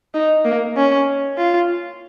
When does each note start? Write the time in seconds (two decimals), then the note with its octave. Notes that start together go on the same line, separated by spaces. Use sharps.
0.14 D#4
0.45 A#3
0.76 C#4
1.38 F4